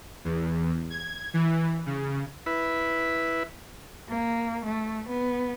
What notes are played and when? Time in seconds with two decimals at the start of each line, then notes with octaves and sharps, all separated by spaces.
0.25 E2
0.90 G#6
1.34 E3
1.86 C#3
2.46 E4 B4
4.09 A#3
4.65 A3
5.09 B3